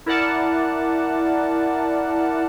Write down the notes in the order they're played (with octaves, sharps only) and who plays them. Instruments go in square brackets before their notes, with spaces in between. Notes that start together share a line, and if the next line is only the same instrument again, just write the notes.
[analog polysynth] E4 A#4 D5 F#5 A5